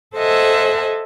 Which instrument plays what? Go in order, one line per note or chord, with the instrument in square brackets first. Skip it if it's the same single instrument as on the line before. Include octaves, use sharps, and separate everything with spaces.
[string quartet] A4 C5 D#5 E5 F#5 G#5